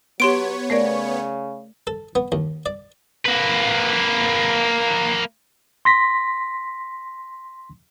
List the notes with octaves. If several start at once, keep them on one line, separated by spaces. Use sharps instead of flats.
F#3 B3 G4 C#5 C6 D7
C#3 A3 A#4 D5
A4
B3
D#2
D5
A#3 B4
C6 A#6 B6